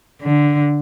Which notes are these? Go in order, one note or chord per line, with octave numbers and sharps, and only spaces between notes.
D3